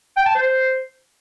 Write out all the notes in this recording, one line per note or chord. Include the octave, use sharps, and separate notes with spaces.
G5
A5
C5